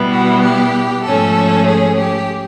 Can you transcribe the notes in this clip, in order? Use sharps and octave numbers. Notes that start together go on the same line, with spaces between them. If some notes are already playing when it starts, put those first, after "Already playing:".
Already playing: B2 G3 B3 E4
F#4
G4
G#2 F3 A3 C#4 A4
G#4
G4